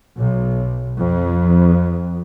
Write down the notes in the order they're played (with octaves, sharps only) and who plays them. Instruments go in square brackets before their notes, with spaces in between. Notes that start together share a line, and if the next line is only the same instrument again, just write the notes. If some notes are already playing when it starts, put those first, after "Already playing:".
[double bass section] B1
F2